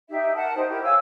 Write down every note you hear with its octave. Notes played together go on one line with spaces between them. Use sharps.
D#4 G4 E5
A#4 F#5 A5
D#4 G4 C5
E4 G4 A#4
C#5 F5 G#5 E6